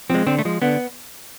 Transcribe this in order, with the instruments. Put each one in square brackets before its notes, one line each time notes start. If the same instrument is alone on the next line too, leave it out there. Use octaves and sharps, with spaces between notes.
[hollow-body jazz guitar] F3 G#3 C4
D3 C4
A3
F3 G#3
D3 B3